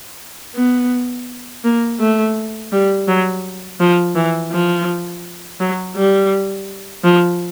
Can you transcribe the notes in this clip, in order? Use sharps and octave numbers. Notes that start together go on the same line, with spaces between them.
B3
A#3
A3
G3
F#3
F3
E3
F3
F#3
G3
F3